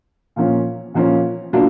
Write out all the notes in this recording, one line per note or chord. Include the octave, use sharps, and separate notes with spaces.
A#2 F3 A#3 C#4 F4
A#2 F3 A#3 C#4 F4
B2 F#3 A#3 D4 F4